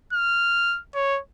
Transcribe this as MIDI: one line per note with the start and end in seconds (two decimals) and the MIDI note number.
0.13 0.80 89
0.95 1.20 73